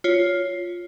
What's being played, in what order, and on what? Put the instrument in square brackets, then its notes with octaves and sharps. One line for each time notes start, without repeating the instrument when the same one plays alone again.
[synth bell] F4 C#5